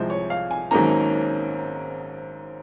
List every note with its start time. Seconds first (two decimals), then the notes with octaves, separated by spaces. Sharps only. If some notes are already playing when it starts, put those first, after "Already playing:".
Already playing: C2 C3 F3 G#3 C5
0.10 C#5
0.30 F5
0.51 G#5
0.71 G#1 G#2 F#3 A#3 C#4 A#5